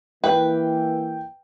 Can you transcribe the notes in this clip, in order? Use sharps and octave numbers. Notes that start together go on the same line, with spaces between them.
E3 A#3 E4 B4 G5